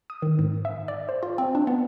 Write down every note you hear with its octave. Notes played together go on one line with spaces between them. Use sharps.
D#6
D#3
G#2
E5
D5
C5
F4
C4
D4
B3